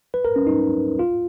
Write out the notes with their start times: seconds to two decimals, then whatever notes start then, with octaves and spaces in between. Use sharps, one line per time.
0.14 B4
0.25 A#4
0.36 C#4
0.47 D#4
0.99 F4